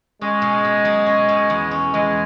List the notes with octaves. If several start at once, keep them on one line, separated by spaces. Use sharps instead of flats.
G#3 C#4
B2
B2
F#3
C#4
B2
E2
C#4
E2 G#3